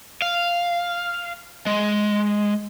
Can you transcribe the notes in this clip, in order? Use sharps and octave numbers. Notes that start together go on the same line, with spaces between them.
F5
G#3